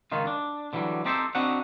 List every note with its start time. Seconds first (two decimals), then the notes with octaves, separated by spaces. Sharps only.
0.12 C#2 D#3 C#4 D#4 F4
0.27 D4
0.73 D3 E3 F#3 G3
1.05 C4 D#4 G4 A4 C5
1.35 C4 D4 D#4 F#4 F#5